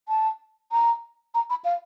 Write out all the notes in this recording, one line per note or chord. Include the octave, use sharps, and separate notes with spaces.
A5
A#5
A#5
B5
F5